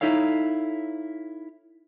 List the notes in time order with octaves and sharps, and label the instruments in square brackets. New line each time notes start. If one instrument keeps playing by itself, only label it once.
[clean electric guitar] D#4 E4 A4 C#5 F5